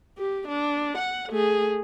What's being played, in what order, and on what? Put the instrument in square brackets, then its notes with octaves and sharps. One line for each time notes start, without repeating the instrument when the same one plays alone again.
[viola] G4
D4
F#5
A3 G#4